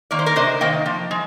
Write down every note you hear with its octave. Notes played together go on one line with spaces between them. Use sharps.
D#3 A#3 D5
C5
A#4 D5
C3 C5 D#5
D#3 A#3 D#5 G5
F3
G#3